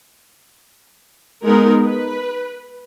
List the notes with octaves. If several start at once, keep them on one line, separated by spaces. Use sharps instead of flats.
G#3 B3 D#4 A#4
B4